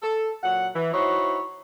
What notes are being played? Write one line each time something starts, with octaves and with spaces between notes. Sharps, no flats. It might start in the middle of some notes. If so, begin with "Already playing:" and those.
A4
A#2 F#3 F#5
E3
D#4 E4 F#4 C5 C#5